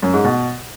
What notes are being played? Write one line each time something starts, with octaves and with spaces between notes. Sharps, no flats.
F#2
G#2
B2